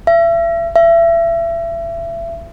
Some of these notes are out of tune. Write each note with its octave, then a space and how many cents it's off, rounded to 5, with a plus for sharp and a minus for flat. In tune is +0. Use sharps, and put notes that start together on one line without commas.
E5 +35
E5 +30